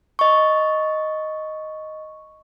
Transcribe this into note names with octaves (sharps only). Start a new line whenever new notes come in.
D#5 C#6